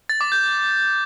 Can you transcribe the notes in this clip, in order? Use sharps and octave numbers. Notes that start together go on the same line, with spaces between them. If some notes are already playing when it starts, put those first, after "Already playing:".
A6
D6
G6